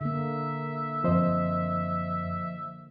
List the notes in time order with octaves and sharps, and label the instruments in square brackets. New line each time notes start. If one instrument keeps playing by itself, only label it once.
[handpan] D3 A#3 [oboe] E5
[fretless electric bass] F#2 C4 [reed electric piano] F3 C5 D#5